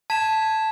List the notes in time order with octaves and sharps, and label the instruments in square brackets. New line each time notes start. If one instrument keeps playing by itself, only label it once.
[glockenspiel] A5 [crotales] G#6 B6 E7